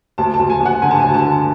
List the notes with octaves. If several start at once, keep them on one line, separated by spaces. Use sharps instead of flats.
D2 A5
A5
D2
G#5
D2
F#5
D3 G#5
A5
D2 G#5
A5
D3